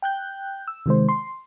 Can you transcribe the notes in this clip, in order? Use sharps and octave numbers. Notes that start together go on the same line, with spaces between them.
G5 F#6 G6
E6
C3 D#3 G#3 C5
C6